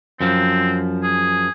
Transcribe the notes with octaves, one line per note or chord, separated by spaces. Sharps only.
F#2 F3 C4
G#4